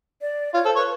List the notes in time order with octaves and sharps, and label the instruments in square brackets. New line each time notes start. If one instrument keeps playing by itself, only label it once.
[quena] D5
[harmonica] F4 [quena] C#5
[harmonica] A4 [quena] C5
[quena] B4 [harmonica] C#5